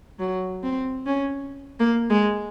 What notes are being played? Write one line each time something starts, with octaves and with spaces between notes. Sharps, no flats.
F#3
C4
C#4
A#3
G#3